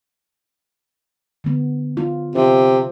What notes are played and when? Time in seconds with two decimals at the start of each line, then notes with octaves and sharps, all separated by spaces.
1.44 D3 B3
1.97 F4
2.35 C3 F4 C5